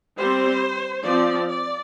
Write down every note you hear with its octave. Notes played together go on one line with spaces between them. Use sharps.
G3 C4 C5
F3 C4 D5
D5